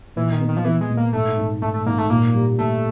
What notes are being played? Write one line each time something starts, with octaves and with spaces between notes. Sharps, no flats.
A#2 E3
D#3
B3
D#3
F3
E3 B3
G#3
A#2
A#3
G#2 A3
G#2
G#2 A3
A3
G#2 A#3
A3
A#2 A#3
G3
A#2 A3